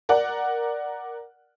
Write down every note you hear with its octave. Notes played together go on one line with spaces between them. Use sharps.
A#4 D5 F#5